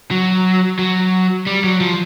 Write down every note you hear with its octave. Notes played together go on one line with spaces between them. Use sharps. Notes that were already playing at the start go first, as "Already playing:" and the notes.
F#3
F#3
G3
F#3
F3